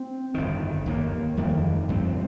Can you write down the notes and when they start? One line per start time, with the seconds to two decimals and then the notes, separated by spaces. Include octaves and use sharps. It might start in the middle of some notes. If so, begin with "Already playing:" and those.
Already playing: C4
0.34 G1 F2 D#3
0.86 D#2 D#3 A#3
1.37 F2 D#3 G3 A#3
1.89 G2 F3 C4